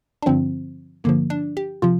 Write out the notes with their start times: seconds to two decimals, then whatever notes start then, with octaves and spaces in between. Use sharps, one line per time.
0.22 D4
0.26 G2 D3 F3 C4
1.04 G2 D3 F3 A#3
1.30 D4
1.57 G4
1.82 C3 F3 F4